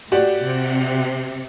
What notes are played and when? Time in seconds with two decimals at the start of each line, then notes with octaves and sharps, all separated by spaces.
0.12 A2 F#4 G4 D5
0.44 C3